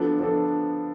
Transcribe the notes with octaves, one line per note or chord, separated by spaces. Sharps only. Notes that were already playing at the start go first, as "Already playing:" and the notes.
Already playing: F3 B3 D4 A4
F3 B3 D4 A4